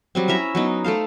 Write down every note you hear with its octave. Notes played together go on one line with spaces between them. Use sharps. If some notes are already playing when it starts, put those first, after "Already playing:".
F#3 G3 C4
C#4 E4 E5 A#5
F#3 B3 D#4
A3 A4 C5 F5